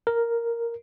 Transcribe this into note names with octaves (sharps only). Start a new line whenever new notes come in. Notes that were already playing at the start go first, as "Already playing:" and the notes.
A#4